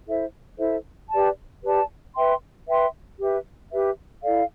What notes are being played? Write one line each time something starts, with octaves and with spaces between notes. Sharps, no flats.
E4 A4 C5 E5
E4 A4 C5 E5
G4 B4 D5 A5
G4 B4 D5 A5
B4 E5 G5 C6
B4 E5 G5 C6
G4 B4 E5
G4 B4 E5
E4 A4 D5 F5